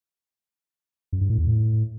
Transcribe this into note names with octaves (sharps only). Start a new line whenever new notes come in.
F#2
G2
A2
E2
A2